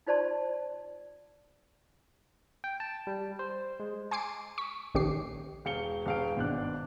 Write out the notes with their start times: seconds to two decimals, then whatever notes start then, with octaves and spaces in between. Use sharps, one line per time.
0.07 D#4 F4 C5 D5 A5 C6
2.64 G5
2.80 A5
3.07 G3
3.39 C5
3.80 G#3
4.11 G#5 C6 D6 C7 D7
4.58 C#6 B6
4.95 A#1 D#3 C#4 G4 D6 C7
5.65 E1 F5 C#7 G7
6.06 E1 F5 D7
6.36 G#1 B2 D4 F#6